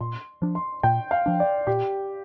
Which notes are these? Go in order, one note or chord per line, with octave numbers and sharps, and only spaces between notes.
A#2 C6
F3 D4
C6
A#2 G5
F5
F3 D4
D5
A#2 G4